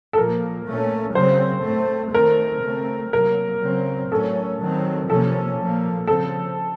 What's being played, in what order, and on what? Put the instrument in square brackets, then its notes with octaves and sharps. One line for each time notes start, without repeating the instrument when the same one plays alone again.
[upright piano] A4
[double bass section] A#2 F3 A#3 [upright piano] A#4
[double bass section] A#2 A3 C#4
[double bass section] C#3 F#3 C4 [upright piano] C5
[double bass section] A2 A3 C4
[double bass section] D#3 A3 C4 [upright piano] A#4
[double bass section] C#3 A3 C4
[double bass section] C3 F#3 A#3 [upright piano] A#4
[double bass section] C#3 F#3 C4
[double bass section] A2 F#3 A3 C#4 [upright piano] A4
[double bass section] D#3 F#3 C4
[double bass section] C3 F3 A#3 C#4 [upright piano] A4
[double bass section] A#2 F3 A#3
[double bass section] C#3 F3 C4 [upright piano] A4